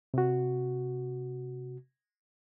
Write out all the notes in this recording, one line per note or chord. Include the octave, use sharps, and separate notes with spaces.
C3 F#4